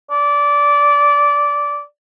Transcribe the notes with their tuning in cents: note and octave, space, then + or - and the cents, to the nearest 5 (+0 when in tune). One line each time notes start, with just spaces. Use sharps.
D5 -15